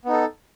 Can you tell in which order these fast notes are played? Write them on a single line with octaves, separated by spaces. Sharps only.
B3 D#4 A4